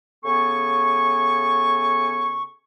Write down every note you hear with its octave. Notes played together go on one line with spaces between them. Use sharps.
C#3 B3 A4 G#5 C#6